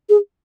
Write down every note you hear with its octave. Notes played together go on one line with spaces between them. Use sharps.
G#4